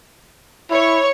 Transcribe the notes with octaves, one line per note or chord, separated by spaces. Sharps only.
E4 C#5